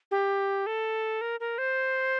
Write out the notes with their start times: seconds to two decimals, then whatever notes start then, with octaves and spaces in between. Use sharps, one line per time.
0.11 G4
0.66 A4
1.21 A#4
1.40 A#4
1.58 C5